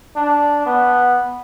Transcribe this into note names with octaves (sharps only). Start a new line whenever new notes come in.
D4
B3